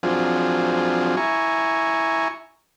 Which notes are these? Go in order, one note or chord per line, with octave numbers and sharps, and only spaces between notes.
F3 F#3 C4 D4 F4 G#4
E4 G#5 A#5 C#6